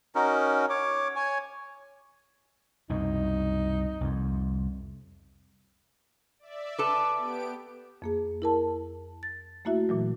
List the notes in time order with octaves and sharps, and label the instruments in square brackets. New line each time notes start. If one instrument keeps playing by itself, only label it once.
[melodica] C#4 D#4 F#4 A#4
C#5 D6
C#5 G#5
[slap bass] C2 F#2 B2 [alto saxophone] D#4
[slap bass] C2 F2
[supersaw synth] D5 E5
[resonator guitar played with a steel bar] A4 B4 [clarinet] D6
[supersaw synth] B3 G4 D7
[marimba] F2 A#3 G#4
E4 A#4 A5
A6
A3 A#3 E4 F#4 E5
A#2 E3 F#3